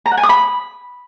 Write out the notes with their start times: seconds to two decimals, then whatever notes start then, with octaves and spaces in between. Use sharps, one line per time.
0.06 A#5
0.11 F#5
0.17 G#5
0.23 D#6
0.29 B5